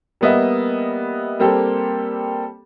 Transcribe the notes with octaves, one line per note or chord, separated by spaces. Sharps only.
G3 A#3 B3 D#5 E5
G3 A#3 C4 G4 A4